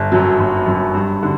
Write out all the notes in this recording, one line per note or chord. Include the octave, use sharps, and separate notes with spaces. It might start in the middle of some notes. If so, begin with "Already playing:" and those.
Already playing: G1
F#2 F#3
G1
F#2 F#3
G2
D3